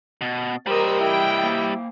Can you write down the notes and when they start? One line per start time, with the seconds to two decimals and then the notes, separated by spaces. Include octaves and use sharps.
0.21 B2
0.67 G3 G4 A#4 C5 D#5 E6
1.00 E4 G5
1.43 A#3 C5 F5